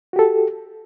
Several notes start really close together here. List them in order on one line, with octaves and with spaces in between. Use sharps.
F#4 G4 A4